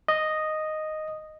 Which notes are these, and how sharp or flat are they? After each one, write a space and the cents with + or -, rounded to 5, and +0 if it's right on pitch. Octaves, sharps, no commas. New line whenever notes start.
D#5 -5